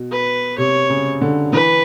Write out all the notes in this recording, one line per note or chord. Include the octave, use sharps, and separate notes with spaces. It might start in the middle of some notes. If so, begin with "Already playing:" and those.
Already playing: B2
B4
C3 C#5
C#3
D3
E3 B4